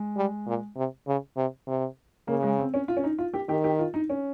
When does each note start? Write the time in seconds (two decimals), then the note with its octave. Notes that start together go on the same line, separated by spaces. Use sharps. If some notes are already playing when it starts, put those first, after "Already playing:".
Already playing: G#3
0.17 G3
0.47 A#2
0.77 C3
1.07 C#3
1.37 C3
1.67 C3
2.28 C#3 A#3
2.43 G#3
2.59 C4
2.74 C#4
2.88 F4
2.97 C#4
3.04 D#4
3.19 F4
3.34 G4
3.49 D#3 G4
3.64 G4
3.79 F4
3.94 D#4
4.10 C#4